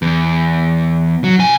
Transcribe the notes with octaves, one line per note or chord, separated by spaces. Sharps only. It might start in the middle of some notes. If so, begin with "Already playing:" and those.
E2
F#3
C3 G#5